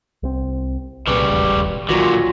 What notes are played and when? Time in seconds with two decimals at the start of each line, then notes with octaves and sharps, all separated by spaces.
0.23 C2 C4
1.07 C2 A#2 C#3 G3 B4
1.30 E1 A1 D#2
1.89 B1 A#2 D3 D#3 F#3 F4 F#4 A#6